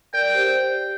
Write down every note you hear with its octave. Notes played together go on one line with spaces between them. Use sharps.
A#4 D5 G5
G4 C5